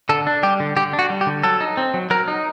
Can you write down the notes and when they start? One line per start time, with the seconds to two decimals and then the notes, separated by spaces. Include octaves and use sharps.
0.09 D3 A4
0.27 D4
0.43 G3 G4
0.60 D3
0.76 D3 G4
0.93 D4
0.99 F#4
1.10 G3
1.21 G4
1.27 D3
1.43 F#3 A4
1.61 D#4
1.77 C4
1.94 F#3
2.10 F#3 A#4
2.28 D#4